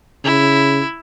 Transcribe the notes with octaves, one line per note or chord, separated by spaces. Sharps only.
C#3 E4